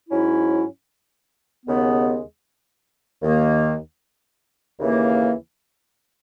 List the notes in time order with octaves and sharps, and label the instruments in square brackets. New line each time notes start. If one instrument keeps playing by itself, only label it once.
[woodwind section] G#2 F#3 C#4 E4
D#2 C#3 G#3 B3
D#2 D#3 A#3
D#2 C#3 E3 A#3